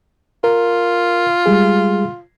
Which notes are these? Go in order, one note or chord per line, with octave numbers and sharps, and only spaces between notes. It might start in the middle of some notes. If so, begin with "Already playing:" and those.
F4 A#4
G3 G#3 G#4